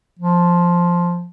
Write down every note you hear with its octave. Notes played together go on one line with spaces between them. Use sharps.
F3